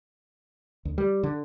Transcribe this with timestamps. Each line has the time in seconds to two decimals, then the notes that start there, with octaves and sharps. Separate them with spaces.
0.85 D2
0.98 G3
1.23 D3